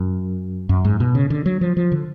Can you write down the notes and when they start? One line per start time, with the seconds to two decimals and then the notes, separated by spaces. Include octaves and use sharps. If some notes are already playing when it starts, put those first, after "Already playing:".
Already playing: F#2
0.69 F#2
0.85 G#2
1.00 B2
1.15 C#3
1.30 D3
1.46 F#3
1.61 F3
1.77 F3
1.92 D3